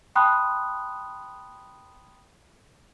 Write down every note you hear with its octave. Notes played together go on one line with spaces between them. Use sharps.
G5 A5 B5 C6 D#6 F#6